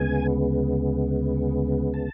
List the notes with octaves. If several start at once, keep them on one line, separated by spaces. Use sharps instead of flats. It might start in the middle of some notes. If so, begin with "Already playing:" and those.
Already playing: D2 C#3 G#3 B3 G#5
A5